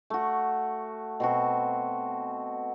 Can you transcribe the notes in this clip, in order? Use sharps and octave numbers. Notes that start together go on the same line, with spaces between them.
A3 F#4
B2 C4 F#4